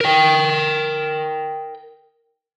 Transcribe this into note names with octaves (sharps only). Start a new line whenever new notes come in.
A#4 G5